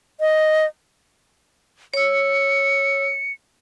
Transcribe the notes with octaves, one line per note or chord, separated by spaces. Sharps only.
D#5
C#5 E6 C#7